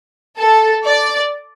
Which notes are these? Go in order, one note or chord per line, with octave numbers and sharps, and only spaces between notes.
A4
D5